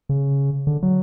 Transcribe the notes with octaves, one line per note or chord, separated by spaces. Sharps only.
C#3
D3
F#3